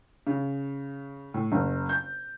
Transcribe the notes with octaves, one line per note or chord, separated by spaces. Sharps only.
C#3
A2
F#1
G6